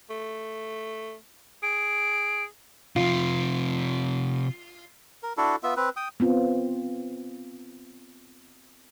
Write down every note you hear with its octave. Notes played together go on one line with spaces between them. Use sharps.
A3
G#4 D7
C3 F3 F4
A#4
D4 E4 F#4 A4
B3 F4 E5
C4 B4
G5 D#6
B3 C4 F4